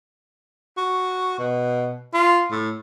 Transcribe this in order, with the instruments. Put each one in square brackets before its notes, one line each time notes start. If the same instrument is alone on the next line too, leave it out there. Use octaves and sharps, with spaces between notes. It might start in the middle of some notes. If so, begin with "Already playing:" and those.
[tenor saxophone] F#4
B2
F4
A2